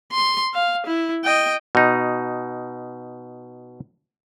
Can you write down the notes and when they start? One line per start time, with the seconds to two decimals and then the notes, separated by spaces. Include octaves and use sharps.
0.12 C6
0.54 F5
0.86 E4
1.24 D#5 G5
1.75 B2 D#4